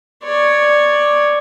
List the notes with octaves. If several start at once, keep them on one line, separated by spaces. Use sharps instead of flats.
C#5 D5